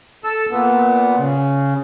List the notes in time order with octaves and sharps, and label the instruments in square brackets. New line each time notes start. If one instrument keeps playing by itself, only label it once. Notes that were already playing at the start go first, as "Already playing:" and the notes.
[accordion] A4 E6
A#2 B3
C#3